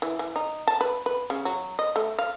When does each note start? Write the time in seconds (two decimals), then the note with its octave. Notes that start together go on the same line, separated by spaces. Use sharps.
0.02 E3
0.19 E3
0.36 D#4
0.68 A5
0.81 B4
1.06 B4
1.30 C#3
1.45 F#3
1.79 D#5
1.96 A3
2.19 F5